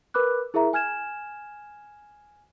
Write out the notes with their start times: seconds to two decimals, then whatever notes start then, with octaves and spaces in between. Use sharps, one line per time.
0.14 A#4 B4 B5 D6 F#6
0.54 E4 G#4 A#4 E5 A#5
0.73 G#5 F6 G#6 E7